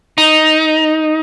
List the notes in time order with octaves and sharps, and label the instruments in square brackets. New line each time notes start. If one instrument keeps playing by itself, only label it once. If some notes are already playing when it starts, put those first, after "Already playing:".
[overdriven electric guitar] D#4